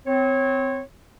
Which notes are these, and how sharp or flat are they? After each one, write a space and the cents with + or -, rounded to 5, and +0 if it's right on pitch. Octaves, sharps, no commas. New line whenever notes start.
C4 -20 C#5 -20